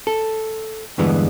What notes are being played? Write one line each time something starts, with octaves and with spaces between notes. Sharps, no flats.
A4
E2 G2 D3 E3 G#3 B3